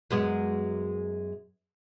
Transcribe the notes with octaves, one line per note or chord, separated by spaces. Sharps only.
F#2 G#3 B3